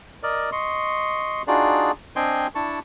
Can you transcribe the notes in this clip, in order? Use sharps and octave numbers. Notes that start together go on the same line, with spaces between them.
A#4 D5 D#5
D#5 C6 C#6
D4 D#4 F4 F#4 G#4 D5
C4 D4 D#5 G5 G#5 C6
D4 E4 A5 C#6